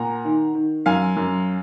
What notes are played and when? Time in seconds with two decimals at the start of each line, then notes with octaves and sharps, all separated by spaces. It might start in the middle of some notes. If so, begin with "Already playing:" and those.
Already playing: A#2 F#5 A#5
0.25 D#3
0.55 D#3
0.86 F#2 F5 G#5
1.17 F#2